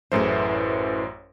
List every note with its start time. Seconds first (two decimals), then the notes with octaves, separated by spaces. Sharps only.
0.12 A1 F#2 E3 A3 G#4 C5